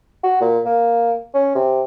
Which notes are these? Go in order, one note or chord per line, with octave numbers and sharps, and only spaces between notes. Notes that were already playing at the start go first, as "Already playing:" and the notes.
F#4
A#2
A#3
C#4
C3